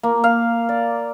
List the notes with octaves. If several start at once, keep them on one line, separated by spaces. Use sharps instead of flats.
A#3
F5
D5